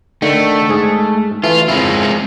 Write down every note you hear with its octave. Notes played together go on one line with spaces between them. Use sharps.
D3 D#3 A3
G#2 G#4
E3 A3 F4
G#3 C4 E4 F4